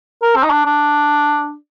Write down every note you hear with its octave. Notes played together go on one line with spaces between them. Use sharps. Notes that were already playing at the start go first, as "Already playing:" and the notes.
A#4
C4
D#4
D4
D4